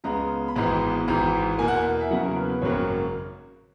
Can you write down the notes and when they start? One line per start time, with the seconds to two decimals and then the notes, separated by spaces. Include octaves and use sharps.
0.04 C#2 C#3 G#3 B3 A#5
0.48 B5
0.56 G#1 G#2 E3 G#3 B3 A#5
1.08 G#1 G#2 E3 A#5
1.58 E2 B2 A#3 G#5
1.68 F#5
1.77 G#5
2.00 E5
2.10 E2 C#3 F#3 A#3 F#5
2.23 A#4
2.36 B4
2.50 B4
2.62 G#1 F#2 C#3 F#3 A#3 C#5